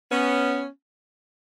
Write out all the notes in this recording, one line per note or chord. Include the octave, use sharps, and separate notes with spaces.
B3 C#4